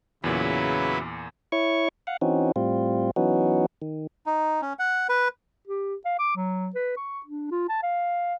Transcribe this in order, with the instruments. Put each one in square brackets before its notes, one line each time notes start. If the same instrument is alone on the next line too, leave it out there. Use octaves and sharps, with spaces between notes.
[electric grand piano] E2 A#2 [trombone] C#3 [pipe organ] F#3 E4 B4
[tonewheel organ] E4 C#5 C#6
F5 F#5
E3 C4 C#4 D#4 F#4
A2 G3 C4 F4
E3 F#3 B3 C#4 D#4 F#4
D#3
[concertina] D#4
C#4
F#5
B4
[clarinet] G4
F5
D6
F#3
B4
C#6
D4
F4
A5
F5